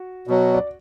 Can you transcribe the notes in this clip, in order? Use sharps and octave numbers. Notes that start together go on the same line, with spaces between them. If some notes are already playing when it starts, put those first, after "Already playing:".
Already playing: F#4
B2 F#3
D5